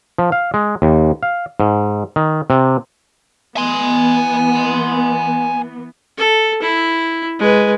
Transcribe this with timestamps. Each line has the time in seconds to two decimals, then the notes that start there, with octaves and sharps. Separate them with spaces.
0.18 F3
0.32 F5
0.54 G#3
0.82 D#2
1.23 F5
1.60 G#2
2.16 D#3
2.50 C3
3.57 E3 B3 G#5 C6
6.18 A4
6.62 E4
7.39 G#3 B4